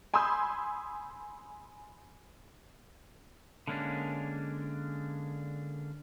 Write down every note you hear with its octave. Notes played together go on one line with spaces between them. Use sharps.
G#5 B5 C6 D#6 E6 G6
D3 G#3 A#3 C#4 D4